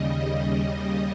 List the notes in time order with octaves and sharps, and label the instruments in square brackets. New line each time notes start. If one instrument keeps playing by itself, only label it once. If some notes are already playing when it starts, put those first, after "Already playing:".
Already playing: [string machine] D#2 C#3 G3 D#5